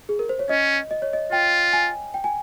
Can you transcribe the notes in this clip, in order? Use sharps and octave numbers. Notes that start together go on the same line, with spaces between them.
G#4
A#4
C5
C#5
C#4 D#5
D#5
C#5
D#5
F4 G5
G#5
G5
G#5